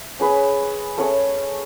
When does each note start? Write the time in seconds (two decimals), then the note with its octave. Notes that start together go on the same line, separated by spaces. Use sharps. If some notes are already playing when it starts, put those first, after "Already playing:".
Already playing: E5
0.19 C#4 G#4 B4
0.97 A3 C#4 G#4 C#5